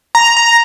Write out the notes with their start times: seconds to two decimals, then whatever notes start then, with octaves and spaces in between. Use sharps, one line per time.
0.15 A#5
0.37 A#5